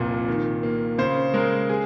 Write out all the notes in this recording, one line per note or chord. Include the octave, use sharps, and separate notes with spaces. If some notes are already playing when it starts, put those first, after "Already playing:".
Already playing: F1 C2 A#2
D#3
A#3
C#3 C5
G#3 A#4
G#4